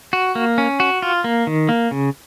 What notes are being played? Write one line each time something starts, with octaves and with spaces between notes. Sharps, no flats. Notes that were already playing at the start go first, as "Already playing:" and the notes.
F#4
A#3
C#4
F#4
F4
A#3
D#3
A#3
C#3